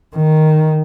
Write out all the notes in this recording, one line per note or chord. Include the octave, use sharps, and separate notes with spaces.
D#3